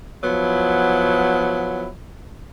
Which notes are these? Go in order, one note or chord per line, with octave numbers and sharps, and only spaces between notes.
F3 F#3 B3 E4